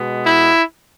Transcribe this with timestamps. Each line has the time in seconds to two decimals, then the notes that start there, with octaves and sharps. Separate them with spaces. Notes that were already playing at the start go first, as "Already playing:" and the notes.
Already playing: B2 G#3 B3
0.25 E4